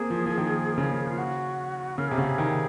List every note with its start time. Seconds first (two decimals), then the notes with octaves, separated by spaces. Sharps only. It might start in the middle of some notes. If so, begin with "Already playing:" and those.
Already playing: A#3 C4 G#4
0.10 F3
0.26 F3
0.38 D#3
0.78 C#3
1.07 F4
1.18 F#4
1.98 C#3 A#4
2.08 C3 G#4
2.18 C#3 F#4
2.27 G#4
2.38 D#3